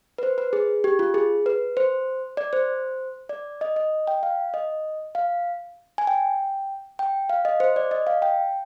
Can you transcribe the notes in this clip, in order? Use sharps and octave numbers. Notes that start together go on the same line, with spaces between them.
B4
C5
B4
G#4
G4
F4
G#4
B4
C5
D5
C5
D5
D#5
D#5
G5
F5
D#5
F5
G#5
G5
G5
F5
D#5
C5
D5
D#5
F5
G5